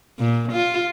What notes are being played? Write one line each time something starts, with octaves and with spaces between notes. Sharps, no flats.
A#2
F4